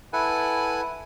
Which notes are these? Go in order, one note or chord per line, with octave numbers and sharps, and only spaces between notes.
E4 A4 B4 F#5 G#5